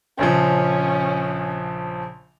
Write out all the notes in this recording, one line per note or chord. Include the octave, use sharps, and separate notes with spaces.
A#1 C#3 F3 C#4